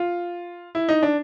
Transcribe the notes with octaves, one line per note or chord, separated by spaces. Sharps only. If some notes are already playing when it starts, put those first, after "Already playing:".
Already playing: F4
E4
D#4
D4